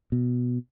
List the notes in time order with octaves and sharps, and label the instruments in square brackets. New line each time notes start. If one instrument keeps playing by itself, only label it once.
[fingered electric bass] B2